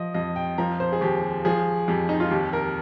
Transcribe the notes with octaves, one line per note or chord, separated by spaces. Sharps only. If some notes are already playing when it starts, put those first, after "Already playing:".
Already playing: F3 D#5
F2 D#5
G5
F3 A#5
C5
G#4
D#2 G4
F3 G#4
F2 G4
D#4
F4
D#2 G4
A#4